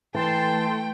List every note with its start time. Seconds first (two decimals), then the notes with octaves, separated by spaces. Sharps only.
0.14 E3 A3 G5 A5 C6